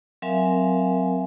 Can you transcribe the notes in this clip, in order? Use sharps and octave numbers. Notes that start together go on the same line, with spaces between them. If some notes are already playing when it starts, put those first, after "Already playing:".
F#3 C4 A#4 E5 F5 G#5